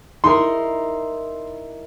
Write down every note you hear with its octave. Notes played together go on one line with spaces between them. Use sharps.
D#4 E4 A#4 C6